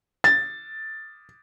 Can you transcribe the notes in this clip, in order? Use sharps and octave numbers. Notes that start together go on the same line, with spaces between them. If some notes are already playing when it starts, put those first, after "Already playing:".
A6